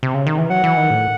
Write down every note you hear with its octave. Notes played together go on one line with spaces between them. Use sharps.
C3
C#3
D#3
E3
F#3 F#5
E3
D#3
A2